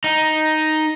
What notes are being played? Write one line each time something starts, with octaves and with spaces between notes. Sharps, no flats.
D#4